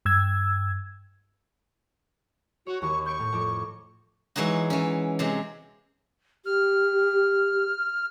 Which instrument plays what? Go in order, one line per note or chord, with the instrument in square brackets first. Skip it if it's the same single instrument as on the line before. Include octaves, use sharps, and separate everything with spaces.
[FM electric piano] G2 E6 G#6
[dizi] F#4 [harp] C#5
[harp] D#2 [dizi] C#6
[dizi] C#6 [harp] G6 D7
[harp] A2
F2 D6
[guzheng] E3 F#3 G#3 D#4 F#4
E3 C#4
C3 F#3 G#3
[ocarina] G4 [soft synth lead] F6